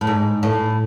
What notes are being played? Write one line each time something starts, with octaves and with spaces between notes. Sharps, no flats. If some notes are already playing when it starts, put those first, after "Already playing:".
A2
G#2
A2